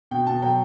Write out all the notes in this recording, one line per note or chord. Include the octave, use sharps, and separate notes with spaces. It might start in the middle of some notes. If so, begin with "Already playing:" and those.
B2 G5
B2 A5
F#3 G5